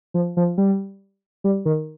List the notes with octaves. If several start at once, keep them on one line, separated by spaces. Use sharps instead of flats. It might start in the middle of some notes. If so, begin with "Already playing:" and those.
F3
F3
G3
G3
D#3